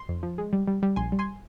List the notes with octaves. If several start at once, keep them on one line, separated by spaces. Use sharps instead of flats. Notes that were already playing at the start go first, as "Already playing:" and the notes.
Already playing: C6
F2
F3
G#3
G3
G3
G3
A#1 G#5 C6
G3
G#5 C6